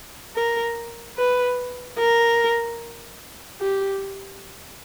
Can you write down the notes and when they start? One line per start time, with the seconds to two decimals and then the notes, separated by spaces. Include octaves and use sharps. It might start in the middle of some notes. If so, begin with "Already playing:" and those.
0.36 A#4
1.18 B4
1.99 A#4
3.60 G4